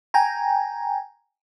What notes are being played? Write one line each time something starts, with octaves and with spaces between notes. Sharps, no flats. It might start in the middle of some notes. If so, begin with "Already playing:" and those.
G5 G#5 A#5